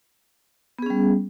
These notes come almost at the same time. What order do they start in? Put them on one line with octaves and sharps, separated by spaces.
B3 G#4 C#4 G3